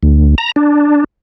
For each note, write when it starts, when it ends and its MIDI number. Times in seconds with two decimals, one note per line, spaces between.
0.03 0.35 38
0.38 0.52 82
0.56 1.04 62